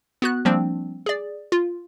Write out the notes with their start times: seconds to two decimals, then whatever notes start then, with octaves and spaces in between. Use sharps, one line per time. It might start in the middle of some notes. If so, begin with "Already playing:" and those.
0.22 B3 F#4 F#6
0.45 F3 G3 A#3 C4 D4
1.06 G#4 D5
1.52 F4